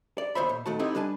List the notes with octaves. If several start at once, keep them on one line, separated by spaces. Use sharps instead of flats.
D5
D#2 B2 C5 C#5 E5 B5
A#2
B1 D#3 A3 F#4 A5
B3 C4 D#4 E4 G4 A4
G3 D4 B4 G#5 A5